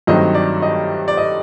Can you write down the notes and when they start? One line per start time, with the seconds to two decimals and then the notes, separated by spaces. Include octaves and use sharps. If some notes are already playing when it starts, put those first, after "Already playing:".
0.07 G2 D#3 F#3 A3 C4 D#5
0.35 D5
0.62 D#5
1.08 D5
1.17 D#5